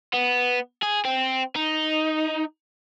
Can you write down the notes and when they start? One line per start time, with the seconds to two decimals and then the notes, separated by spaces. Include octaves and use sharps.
0.13 B3
0.82 G#4
1.05 C4
1.56 D#4